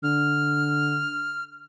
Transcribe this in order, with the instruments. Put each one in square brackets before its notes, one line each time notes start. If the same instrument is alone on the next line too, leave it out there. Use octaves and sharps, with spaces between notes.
[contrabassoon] D3 [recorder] F6